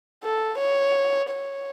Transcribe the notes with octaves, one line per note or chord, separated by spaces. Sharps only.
A4
C#5
C#5